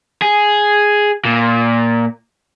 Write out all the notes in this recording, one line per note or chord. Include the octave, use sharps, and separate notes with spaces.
G#4
A#2